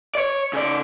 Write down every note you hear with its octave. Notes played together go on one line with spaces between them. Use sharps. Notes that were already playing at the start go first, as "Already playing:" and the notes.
C#5 D5
C#3 D5